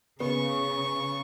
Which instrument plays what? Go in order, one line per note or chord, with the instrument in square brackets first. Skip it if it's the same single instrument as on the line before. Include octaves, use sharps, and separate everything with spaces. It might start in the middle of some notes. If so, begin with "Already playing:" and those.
[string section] C#3 [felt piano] B3 [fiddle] C#6